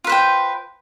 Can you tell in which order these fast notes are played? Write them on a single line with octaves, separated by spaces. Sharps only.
F4 B4 C5 G5